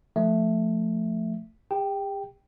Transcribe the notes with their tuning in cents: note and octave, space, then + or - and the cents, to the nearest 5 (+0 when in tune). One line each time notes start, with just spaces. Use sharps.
F3 +0 A3 +0 E5 +0
G4 +45 G5 +0